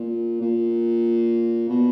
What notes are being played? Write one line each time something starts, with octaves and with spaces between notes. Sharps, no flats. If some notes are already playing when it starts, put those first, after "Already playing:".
Already playing: A#2
A#2
B2